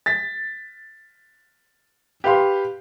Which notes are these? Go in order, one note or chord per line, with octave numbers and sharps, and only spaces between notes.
A6 B6
G4 B4 F5 C6